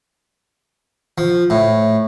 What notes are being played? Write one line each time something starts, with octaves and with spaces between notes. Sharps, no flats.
F3
A2